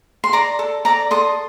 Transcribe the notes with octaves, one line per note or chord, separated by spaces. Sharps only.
C6
D5 A#5 D6
A4
D5 A#5 D6
A4 C6 D#6